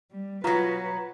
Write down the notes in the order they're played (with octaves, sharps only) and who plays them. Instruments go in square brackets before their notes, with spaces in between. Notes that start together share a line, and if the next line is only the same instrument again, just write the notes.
[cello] G3
[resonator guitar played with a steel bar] B2 F#3 [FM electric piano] F4 A#5 [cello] B4 F#5